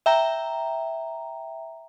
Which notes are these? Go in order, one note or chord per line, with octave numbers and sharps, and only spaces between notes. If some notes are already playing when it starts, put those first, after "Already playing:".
E5 G5 A#5